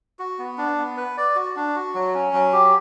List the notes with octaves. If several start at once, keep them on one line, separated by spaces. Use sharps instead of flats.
F#4
B3
D4
B3
B4
D5
F#4
D4
F#4
F#3
C#4
F#3
G4